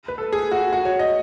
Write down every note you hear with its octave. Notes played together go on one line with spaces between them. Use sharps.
B4
A4
G#4
F#4
F#4
C#5
D#5